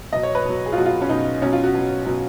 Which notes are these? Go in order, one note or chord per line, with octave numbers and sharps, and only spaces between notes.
B2 F#3 D#5
C#5
B4
B2 F#3
G#4
F4
B2 F#3 F#4
F4
C#4
B2 F#3 D#4
B2 F#3 C#4
F4
F#4
B2 F#3
B2 F#3